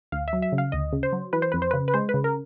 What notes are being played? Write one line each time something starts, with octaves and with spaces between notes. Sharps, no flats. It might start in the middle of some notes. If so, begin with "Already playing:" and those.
D2 F5
E5
F#3
E5
C#3
F5
D2 D#5
C#3
C5
F#3
E3 B4
C5
F2 B4
C5
C#3 B4
B4
G#3 C5
B4
C#3
A#4